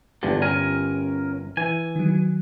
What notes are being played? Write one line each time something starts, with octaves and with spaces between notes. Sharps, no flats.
G1 E2 G2 D3 G4
C#4 A#4 G#5
E3 G#5
D#3 F#3